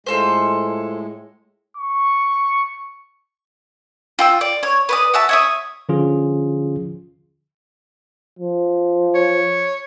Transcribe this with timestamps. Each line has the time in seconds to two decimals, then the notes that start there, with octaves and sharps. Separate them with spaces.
0.06 A2 G#3 F4 A4 C5
1.77 C#6
4.19 F4 G5 E6
4.41 D5
4.63 C#5
4.89 B4 D5 D#6
5.14 F#4 E5 A5
5.29 C#5 E5 D#6
5.89 D3 F3 C#4 F4 G#4
8.39 F3
9.15 C#5